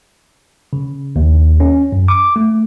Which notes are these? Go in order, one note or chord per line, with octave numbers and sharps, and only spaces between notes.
C#3
D#2
C#4
F#2
D6
A3